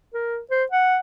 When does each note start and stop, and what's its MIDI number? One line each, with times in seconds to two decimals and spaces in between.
0.14 0.39 70
0.51 0.64 72
0.72 0.98 78